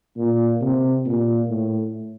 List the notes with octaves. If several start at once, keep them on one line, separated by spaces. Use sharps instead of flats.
A#2
C3
A#2
A2